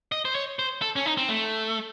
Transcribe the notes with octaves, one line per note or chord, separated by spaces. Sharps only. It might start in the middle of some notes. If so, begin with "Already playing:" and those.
D#5
C5
C#5
C5
A4
C#4
D#4
C4
A3